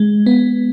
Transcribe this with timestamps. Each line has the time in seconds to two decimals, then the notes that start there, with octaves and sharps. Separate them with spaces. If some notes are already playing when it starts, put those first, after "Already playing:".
Already playing: G#3
0.26 B3